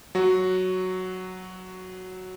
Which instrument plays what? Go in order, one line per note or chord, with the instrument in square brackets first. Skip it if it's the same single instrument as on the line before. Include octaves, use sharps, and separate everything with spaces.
[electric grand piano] F#3 F#4